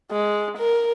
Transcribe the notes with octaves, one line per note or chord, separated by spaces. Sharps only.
G#3
A#4